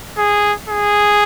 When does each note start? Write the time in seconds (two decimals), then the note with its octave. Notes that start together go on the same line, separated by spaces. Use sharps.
0.18 G#4
0.69 G#4